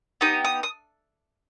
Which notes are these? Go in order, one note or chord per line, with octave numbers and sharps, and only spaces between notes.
B3 D#4 G4 D#6
D#6
D#6